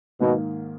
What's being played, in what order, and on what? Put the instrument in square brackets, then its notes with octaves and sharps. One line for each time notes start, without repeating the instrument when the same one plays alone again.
[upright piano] G#2 D#3 A#3 [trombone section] B2